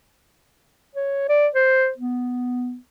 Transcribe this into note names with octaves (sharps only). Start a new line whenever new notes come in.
C#5
D5
C5
B3